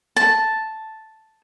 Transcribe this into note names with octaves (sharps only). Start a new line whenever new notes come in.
A5